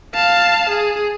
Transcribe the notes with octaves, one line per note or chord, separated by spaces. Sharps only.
F5 A5
G#4